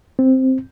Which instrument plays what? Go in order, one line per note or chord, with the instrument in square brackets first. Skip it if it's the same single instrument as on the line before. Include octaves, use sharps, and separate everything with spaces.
[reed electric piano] C4